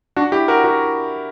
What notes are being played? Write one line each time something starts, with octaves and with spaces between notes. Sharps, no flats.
D4 F#4
E4 G4
F#4 A#4
F#4 A#4